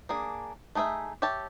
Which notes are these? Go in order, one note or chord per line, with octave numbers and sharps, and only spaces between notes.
A#3 D4 G#4
A3 D#4 G#4 D5 E5
G4 C#5 E5 A5